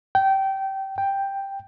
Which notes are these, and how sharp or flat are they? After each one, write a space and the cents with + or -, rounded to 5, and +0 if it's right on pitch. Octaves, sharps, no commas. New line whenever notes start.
G5 -20
G5 +5